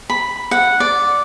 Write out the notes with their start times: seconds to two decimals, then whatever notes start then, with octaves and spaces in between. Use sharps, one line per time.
0.10 B5
0.51 F#5
0.80 D5